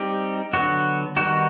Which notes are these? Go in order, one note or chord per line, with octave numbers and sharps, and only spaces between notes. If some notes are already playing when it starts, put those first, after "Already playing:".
Already playing: G3 C4 D#4 G4
D3 F#3 B3 F#4
D#3 G3 B3 D#4 F#4